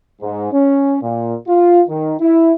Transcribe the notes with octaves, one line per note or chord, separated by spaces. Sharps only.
G#2
C#4
A#2
F4
D#3
E4